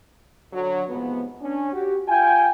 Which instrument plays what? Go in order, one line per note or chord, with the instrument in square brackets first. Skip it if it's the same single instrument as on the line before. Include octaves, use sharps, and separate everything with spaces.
[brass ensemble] D3 F#3
B1 G#2 C3 F3 B3
C#4 D4
F#4 G4
F4 G5 G#5